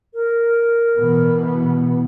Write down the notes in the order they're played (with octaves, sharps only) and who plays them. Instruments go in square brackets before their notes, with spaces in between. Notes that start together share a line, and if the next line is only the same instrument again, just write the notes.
[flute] A#4
[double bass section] B2 E3 B3